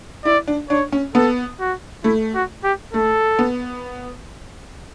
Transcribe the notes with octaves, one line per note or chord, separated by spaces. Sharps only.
E4 D5
D4
D4 C#5
C#4
B3 A4
F#4
A3 E4
F#4
G4
A3 A4
B3